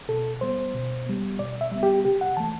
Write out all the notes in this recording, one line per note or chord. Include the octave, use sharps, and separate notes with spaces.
B2 A4
G3 B3 C5
B2
G3 B3
B2 D5
E5
G3 B3
G4
C3 G4
F#5
E3 A3 A5